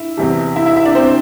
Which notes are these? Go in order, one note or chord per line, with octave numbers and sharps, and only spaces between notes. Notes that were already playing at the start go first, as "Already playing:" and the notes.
Already playing: E4 E5
E2 C3 E3 G3
E4 E5
E4 E5
E4 E5
D4 D5
C4 C5